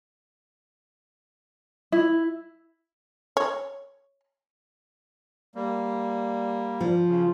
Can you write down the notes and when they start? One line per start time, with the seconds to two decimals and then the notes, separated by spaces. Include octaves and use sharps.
1.92 E4
3.37 C#5
5.55 G3 A#3
6.81 F3
7.08 C#3